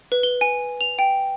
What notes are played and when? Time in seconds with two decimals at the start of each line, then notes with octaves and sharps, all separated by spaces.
0.12 B4
0.23 G7
0.41 G#5
0.81 F7
0.99 G5